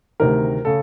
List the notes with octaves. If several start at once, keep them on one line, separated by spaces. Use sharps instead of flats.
D2 C3 D#3 A#4
C#3 A4